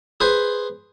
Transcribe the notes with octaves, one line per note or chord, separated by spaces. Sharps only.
G#4 B4 C5 G#5